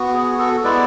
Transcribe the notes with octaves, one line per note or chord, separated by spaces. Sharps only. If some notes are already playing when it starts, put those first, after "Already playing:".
Already playing: B3 F#4
G#4
F#4 A4
G#3 B3 E4 B4 D5